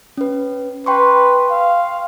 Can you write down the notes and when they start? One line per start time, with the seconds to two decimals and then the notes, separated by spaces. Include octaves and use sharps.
0.17 C#4 B4
0.86 B4 G5 C6 C#6
1.50 F5